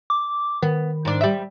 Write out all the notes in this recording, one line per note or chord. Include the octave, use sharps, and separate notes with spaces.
D6
D#3 B3
G#2 D4
G3 E5